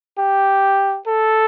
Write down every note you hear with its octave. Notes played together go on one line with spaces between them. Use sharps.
G4
A4